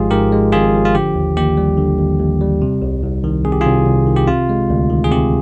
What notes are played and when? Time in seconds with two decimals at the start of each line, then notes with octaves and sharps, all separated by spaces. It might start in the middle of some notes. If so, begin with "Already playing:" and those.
Already playing: G#1 G#2 F3 G#3 F4 G4 G#4
0.11 G#2 G4 A#4
0.32 G#3
0.52 G#1 F4 G#4
0.74 F3
0.85 F4
0.95 D3 G4
1.15 D#2
1.37 D#2 G4
1.57 G3
1.77 D3
1.99 D#2
2.19 D#2
2.41 G3
2.62 C3
2.82 C2
3.03 C2
3.24 D#3
3.45 C3 G#4
3.52 G4
3.61 C2 F4 G#4
3.86 C2
4.07 D#3
4.16 G4
4.27 C3 F4
4.49 G#3
4.70 D2
4.90 D#3
5.04 G#4
5.11 C3 G4